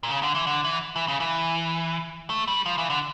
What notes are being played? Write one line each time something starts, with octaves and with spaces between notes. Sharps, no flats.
A#2
C#3
D3
E3
D3
E3
E3
C#3
E3
A3
G3
F3
E3
D3